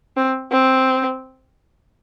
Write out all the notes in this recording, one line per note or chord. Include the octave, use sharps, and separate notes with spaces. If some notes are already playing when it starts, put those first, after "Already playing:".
C4
C4